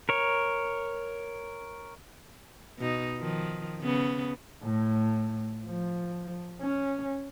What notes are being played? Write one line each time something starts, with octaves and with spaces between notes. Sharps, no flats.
A#4 C#5
B2 D#4
D#3 F3
C#3 B3
A2
F3
C#4